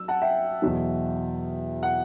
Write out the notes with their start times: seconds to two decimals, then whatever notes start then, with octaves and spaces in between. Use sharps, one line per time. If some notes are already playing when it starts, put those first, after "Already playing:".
Already playing: F#3 E6
0.08 F#5 A5
0.22 E5 G5
0.62 E2 B2 F#3
1.83 F#5